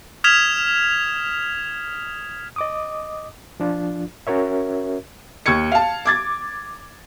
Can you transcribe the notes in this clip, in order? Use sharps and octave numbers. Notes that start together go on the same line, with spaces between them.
D#6 F6 G#6 B6 E7 F7
D#5 D6 D#6
F3 D4 F4
C#4 F#4 A#4 C#5 E5
D#2 C#6 G#6 C#7
F5 A5
D6 G#6 A6